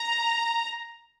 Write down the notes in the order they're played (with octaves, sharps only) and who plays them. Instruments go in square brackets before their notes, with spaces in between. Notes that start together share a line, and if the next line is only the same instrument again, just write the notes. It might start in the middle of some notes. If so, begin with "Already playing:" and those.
Already playing: [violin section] A#5